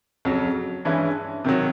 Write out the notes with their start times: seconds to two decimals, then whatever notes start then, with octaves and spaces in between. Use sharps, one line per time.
0.25 F2 C#3 F#3
0.85 G2 E3 G#3 C#4 E4
1.45 C3 D#3 F#3